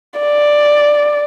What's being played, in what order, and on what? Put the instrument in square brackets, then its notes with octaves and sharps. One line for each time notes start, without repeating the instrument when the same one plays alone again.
[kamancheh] D5